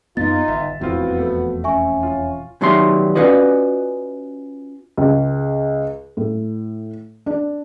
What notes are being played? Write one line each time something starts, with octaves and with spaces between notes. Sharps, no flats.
F#2 B3 D#4 F4 A6
G1 E5
E1 F2 A2 B3 C4 F4 F#4
F3 A3
C#4 E5 G#5 C#6
F4
B2 D#3 F#3 G3 E5 C6
C#4 F4 F#4 B4 D5 D#5
C#2
A2
D4